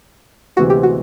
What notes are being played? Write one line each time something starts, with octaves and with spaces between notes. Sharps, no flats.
D2 C3 E3 G#3 B3 F#4
G4
F#4